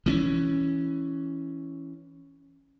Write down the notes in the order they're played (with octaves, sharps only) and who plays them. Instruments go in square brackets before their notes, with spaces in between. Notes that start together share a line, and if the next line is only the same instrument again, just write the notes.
[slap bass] E3 C4 C#4